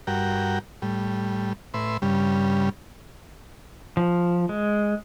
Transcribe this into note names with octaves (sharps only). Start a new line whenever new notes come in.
G2 F#4 A#4 G5
A2 G3
A2 B4 E5 C6
G2 C#3 G3
F3
G#3